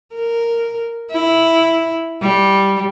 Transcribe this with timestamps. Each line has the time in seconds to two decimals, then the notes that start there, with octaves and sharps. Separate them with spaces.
0.15 A#4
1.11 E4
2.22 G3